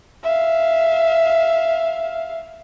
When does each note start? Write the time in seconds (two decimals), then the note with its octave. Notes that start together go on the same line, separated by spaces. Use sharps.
0.23 E5 F5